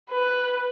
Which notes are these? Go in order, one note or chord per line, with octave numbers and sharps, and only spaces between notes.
B4